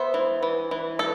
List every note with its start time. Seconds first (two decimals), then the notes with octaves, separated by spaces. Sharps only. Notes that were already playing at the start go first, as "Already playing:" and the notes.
Already playing: B3 C5 E5
0.14 E3
0.43 E3
0.71 E3
0.99 A4